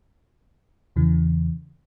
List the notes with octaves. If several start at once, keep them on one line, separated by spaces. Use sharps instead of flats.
E2 C#3 E3